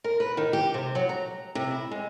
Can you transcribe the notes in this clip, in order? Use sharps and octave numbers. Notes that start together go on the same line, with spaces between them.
A#4
B4
D#3
G4
C3
F#3
A#5
C3
E4
G#3